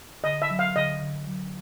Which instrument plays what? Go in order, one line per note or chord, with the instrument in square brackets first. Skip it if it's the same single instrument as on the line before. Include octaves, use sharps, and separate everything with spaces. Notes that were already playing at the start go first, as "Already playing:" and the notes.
[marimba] D3 [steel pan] D#5
[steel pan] E5
[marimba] F#3
[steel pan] F5
[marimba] D3 [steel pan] D#5
[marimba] D3
F#3